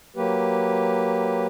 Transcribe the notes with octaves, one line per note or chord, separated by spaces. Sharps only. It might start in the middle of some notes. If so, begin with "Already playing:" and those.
F#3 A#3 G4 B4